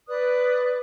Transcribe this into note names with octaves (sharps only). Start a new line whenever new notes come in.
B4 D5 D#6 F#6